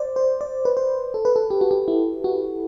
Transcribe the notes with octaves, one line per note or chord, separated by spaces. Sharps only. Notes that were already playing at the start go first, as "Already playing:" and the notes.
Already playing: C5 D5
C5
D5
B4
C5
A4
B4
A4
G4
F#4
G4
E4
F#4